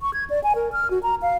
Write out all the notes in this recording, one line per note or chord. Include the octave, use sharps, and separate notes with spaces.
C#6
G#6
D5
G#5
A#4
F6
F#4
A#5
F5